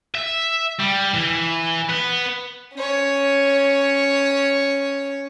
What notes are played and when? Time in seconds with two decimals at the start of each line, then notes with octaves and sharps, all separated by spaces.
0.15 E5
0.79 G3
1.14 E3
1.89 B3 B4
2.75 C#4 C#5